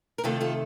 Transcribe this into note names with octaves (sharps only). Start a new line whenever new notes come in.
A#4
C3 D#3 A3 F4 A4
F4 A4